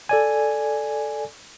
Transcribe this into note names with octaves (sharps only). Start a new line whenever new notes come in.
A4 D5 G#5